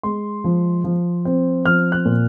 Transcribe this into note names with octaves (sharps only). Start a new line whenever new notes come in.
G#3 C6
F3
F3
C4
F3 F6
F#6
A#2